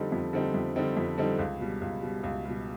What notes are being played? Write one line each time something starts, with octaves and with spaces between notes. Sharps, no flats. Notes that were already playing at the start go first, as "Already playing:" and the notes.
Already playing: F2 D3 G3 C4 D#4
F2
D3 G3 C4 D#4
F2
D3 G3 C4 D#4
F2
D3 G3 C4 D#4
C#2
B2 G3
C#2
B2 G3
C#2
B2 G3